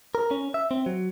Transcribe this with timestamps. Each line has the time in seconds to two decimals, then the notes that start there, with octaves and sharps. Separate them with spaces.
0.15 A#4
0.31 C#4
0.54 E5
0.71 C4
0.86 F#3